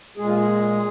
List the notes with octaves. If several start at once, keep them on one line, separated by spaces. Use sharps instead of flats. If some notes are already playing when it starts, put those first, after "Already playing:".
A#2 G#3 G#4
F4
G#4